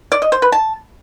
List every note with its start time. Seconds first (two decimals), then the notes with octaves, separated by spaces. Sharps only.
0.12 D5
0.22 D#5
0.32 C5
0.42 B4
0.52 A5